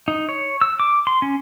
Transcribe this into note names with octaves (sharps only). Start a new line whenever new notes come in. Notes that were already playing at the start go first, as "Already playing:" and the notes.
D#4
C#5
E6
D6
C6
C#4